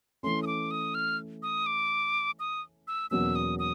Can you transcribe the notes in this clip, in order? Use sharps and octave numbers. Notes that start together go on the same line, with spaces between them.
E3 A3 C#4 C6
D#6
D6
D#6
F6
D#6
D6
D#6
E6
E2 B2 F#3 A#3 C#4 E6
D#6
D#6